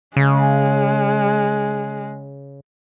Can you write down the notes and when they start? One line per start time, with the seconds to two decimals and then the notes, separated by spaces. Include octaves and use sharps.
0.17 C#3 G#3